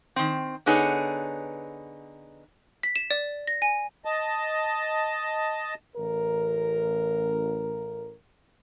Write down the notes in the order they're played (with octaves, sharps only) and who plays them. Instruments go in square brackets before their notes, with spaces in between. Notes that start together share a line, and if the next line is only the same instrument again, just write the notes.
[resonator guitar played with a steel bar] D#3 C4
D3 B3 D#4 G#4 B4 C#5
[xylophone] B6
E7
D5
A#6
G#5
[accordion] D#5 A5
[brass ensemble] A1 A#4